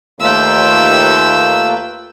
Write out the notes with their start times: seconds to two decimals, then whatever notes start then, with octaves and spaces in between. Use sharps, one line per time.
0.20 D#2 A3 A#3 F4 B4 G5 E6